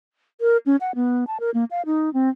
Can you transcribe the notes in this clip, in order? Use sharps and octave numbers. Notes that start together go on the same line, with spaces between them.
A#4
C#4
F#5
B3
A5
A#4
A#3
F5
D#4
C4